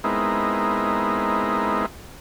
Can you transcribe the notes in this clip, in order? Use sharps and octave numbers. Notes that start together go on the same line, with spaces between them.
G#3 B3 C4 D#4 E4 A#4